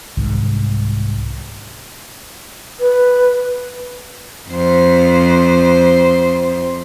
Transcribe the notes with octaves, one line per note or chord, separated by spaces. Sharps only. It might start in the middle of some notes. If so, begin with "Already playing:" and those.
C2 G#2 D#3
B4
F2 C5